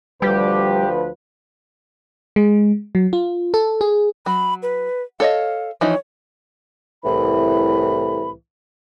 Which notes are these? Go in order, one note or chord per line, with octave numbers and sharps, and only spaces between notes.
D2 F3 G3 G4 B4
G#3
F#3
F4
A4
G#4
F#3 B5
B4
A4 C#5 D#5 F5
E3 F3 D#4 C#5
C2 A2 E3 B5